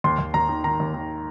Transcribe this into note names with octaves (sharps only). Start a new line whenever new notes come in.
D#2 C6
D#2
D#2 A#5
D#3
D#3 A#5
D#2
D#3